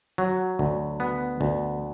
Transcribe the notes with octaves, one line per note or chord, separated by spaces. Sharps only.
F#3
D2
B3
D2